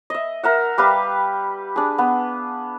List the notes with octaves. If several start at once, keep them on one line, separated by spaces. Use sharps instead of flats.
D#5 E5
A#4 E5 F#5
G3 G4 B4 F5
D4 G#4
B3